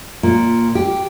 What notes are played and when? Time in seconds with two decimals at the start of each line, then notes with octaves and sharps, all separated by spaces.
0.23 A#2
0.75 G4